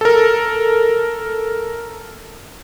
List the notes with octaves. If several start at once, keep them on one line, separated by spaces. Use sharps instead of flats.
A4 A#4